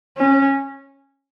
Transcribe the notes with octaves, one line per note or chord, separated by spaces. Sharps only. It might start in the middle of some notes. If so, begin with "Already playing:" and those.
C#4